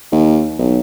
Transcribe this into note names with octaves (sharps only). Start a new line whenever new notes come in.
D#2
B1